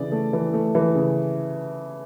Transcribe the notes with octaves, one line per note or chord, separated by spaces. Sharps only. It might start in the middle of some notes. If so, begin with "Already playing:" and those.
Already playing: C#3 E3 D5
A3
E3
A3
E3
C#3